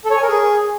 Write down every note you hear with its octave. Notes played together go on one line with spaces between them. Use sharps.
A4
C#5
G#5
A#4
G#4